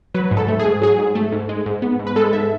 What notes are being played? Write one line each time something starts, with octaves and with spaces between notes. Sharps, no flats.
F#3 B4
G#2
A4
A3
G#4
G#2
F#3 G#4
G#2
A3
G#2
G#3
G#2
B3
G#2
B4
G#3 A4
G#2 E5